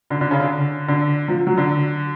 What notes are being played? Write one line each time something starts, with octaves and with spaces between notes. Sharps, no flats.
D3
D3
C#3
D3
D3
F3
F#3
D3